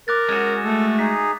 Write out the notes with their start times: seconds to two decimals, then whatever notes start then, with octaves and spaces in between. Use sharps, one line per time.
0.08 A#4 D6 F#6 A6
0.29 G#3 C#4 F#4
0.64 A3 A4
0.99 D#4 G#4 B6